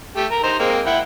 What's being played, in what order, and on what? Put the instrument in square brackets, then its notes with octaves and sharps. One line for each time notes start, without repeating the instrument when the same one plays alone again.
[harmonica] A3 G4
A#4 A#5
D#4 C5 A#5
G#3 A#3 C4
E4 F#5 G5